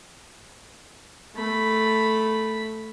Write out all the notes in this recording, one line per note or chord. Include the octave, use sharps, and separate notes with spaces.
A3 B5